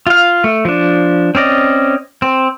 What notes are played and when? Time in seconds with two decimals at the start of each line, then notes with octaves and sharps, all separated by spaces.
0.07 F4 F5
0.44 A3
0.65 F3 D4
1.35 C4 C#4 D5 D#5
2.22 C4